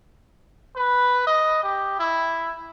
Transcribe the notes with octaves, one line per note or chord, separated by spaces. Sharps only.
B4
D#5
G4
E4